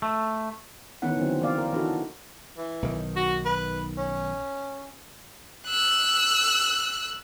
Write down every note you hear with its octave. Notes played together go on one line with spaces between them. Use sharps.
A3
D#3 E3 B3 C#4 D#4 F#5
D3 D#3 F#3 C4
E3 A#3 C4 D5 F5
A#4
E3 D4 D#4 F#4 A4
E3
B1 D#3
F#4
B4
C#4
E6 F#6